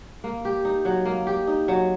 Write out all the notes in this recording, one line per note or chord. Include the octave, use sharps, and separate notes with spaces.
A#3
G4
D#4
F#3
A#3
G4
D#4
F#3